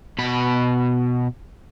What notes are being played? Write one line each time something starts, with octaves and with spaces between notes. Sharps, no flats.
B2 B5